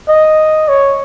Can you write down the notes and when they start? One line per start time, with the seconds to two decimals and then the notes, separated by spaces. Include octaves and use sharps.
0.09 D#5
0.69 C#5